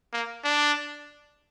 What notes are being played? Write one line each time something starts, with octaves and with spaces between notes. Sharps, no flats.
A#3
D4